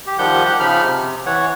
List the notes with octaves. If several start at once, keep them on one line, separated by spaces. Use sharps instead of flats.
G4
D#3 F3 G3 G4 F#5 G6
G4 F#5
C#3 F3 D#4 B5 F6
C3
E3 C#5 F#5